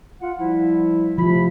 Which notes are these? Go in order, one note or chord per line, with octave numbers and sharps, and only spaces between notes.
F4 F#5
F3 G3 E4
C3 F3 A3 B5